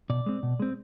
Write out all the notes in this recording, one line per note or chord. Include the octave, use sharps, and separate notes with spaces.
B2 D5
G#3 C4
B2
G#3 C4